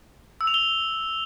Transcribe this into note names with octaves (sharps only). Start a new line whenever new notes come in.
E6
F7
G7